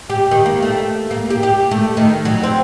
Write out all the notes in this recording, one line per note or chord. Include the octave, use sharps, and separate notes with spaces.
G4
D#3
A#3
A3
A#3
G4
G4
A3
D#3
F#3
C4